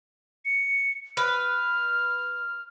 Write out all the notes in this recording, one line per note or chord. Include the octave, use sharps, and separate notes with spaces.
C#7
B4 F6